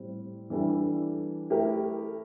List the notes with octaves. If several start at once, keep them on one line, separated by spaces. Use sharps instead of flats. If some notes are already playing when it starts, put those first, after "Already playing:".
Already playing: A2 G3 C4
E3 G3 D4 A4
A3 E4 G4 A#4